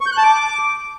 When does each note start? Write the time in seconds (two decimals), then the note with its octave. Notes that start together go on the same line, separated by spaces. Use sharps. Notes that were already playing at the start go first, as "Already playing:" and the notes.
0.01 C#6
0.06 G6
0.12 F#6
0.18 A5
0.23 D6